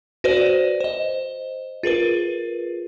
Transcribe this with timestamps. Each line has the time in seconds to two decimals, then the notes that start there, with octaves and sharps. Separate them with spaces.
0.24 F#4 B4 C5 D5
0.80 C5 D#5
1.83 F4 G#4 A#4 B4